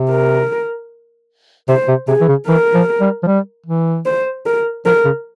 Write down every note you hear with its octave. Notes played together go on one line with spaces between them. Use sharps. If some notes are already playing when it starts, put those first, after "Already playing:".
Already playing: C3
A#4
C3 C5
C3
C3 G#4
E3
C#3
E3 A#4
F3
G3
F3
G3
E3
C5
A#4
F3 A#4
C#3